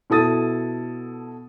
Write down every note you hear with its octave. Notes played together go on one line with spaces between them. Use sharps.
B2 E4 A4 D#6 A6 D#7